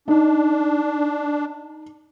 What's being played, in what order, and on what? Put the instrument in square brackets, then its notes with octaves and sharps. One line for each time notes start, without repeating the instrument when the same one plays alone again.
[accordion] D4 [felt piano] D#4